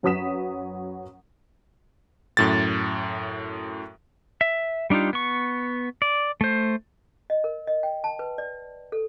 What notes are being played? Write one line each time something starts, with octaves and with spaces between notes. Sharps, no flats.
F#2 F#3 B4 D#6 B6 E7
F#2 A2 A6
E5
G3 D4 D#4 F4 G4
B3 C#6
D5
A3 C5
D#5
A#4
D#5
G5
A5
B4
D5
A4